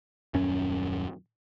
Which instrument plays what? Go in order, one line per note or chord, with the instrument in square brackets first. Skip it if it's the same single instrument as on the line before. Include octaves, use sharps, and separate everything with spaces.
[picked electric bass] D#1 F#2 C#4